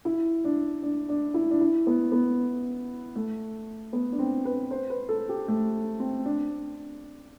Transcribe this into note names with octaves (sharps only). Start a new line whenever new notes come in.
E4
D4
D4
D4
E4
D4
E4
B3
B3
A3
B3
D4
C4
B4
C5
B4
A4
G4
A3
C4
D4